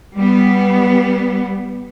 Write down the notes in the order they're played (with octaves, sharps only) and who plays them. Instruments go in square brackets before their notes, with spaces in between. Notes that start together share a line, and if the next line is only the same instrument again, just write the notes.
[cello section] G3 B3